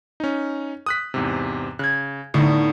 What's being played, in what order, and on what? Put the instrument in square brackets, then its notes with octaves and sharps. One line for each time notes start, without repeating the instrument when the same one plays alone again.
[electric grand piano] C#4 D#4
D#6 F#6 B6
E2 G#2 C3
[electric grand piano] C#3 [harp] F#6 G#6
[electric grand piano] A2 A3 [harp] D3 B3 D#4